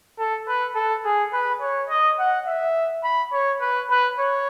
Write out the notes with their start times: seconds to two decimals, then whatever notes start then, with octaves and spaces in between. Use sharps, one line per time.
0.19 A4
0.48 B4
0.75 A4
1.05 G#4
1.33 B4
1.61 C#5
1.90 D#5
2.19 F#5
2.47 E5
3.04 B5
3.33 C#5
3.61 B4
3.91 B4
4.19 C#5